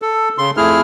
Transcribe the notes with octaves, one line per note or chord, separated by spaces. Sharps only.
A4
C#3 C6
F2 A3 E4 G#4 F6